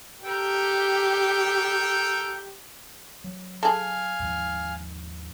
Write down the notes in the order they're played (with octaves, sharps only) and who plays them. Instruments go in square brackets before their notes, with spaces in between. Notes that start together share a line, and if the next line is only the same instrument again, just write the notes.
[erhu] G4 [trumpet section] A4 A#4 G5
[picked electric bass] F#3
[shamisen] G#4 A4 [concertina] F5 G#5 F6
[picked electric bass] D#2 G#2 F3